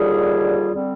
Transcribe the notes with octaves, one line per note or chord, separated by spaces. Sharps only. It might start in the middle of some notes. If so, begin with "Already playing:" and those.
Already playing: D#2 D3 G3 F4 G#4
D3 G3 C4